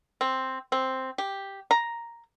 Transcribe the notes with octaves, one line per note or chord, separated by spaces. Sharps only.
C4
C4
G4
A#5